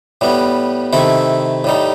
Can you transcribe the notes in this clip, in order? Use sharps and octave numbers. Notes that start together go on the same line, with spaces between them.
A2 G3 B3
C3 D#3 A3 E4 A4
A2 G3 D#4